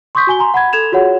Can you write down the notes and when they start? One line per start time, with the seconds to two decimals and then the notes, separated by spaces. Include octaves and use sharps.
0.15 C6 C#6 D#6 G6 B6
0.27 F#4 G#5 G7
0.39 G#5 A#5 C6
0.54 F#5 B5 G#6
0.73 A4 G#6 E7 F7
0.92 F4 F#4 G#4 C#5 F#5